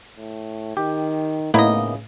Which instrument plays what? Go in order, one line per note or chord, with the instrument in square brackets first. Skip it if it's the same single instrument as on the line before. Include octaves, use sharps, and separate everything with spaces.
[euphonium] A2
[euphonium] D#3 [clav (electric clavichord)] G4
[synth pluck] A2 [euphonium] C#3 [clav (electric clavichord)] A#3 B3 D#4 [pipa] E4 D#5